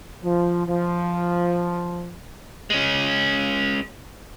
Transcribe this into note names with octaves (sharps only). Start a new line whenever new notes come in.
F3
F3
G#3 C#4